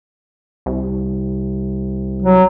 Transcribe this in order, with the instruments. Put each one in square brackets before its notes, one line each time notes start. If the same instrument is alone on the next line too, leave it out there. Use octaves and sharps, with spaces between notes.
[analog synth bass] C2
[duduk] F#3